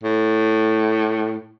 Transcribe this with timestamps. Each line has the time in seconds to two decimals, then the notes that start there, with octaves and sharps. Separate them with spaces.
0.03 A2